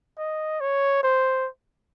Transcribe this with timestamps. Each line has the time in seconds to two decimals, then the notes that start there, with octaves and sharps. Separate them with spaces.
0.18 D#5
0.61 C#5
1.03 C5